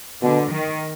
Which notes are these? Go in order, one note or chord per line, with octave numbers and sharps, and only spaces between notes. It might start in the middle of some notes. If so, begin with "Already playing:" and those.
B2 D3
D#3